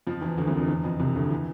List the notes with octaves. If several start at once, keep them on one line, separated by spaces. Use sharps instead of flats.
F2 F3
E2 E3
D2 D3
C2 C3
F2
E2
F2
C2 C3
D2 D3
E3